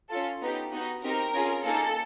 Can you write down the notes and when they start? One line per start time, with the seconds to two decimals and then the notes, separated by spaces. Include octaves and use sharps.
0.10 C#4 F4 A4
0.41 B3 D#4 G4
0.72 B3 D#4 F#4
1.03 C4 D#4 G4 A#4
1.33 C#4 F4 G#4
1.65 A#3 D#4 G#4 A4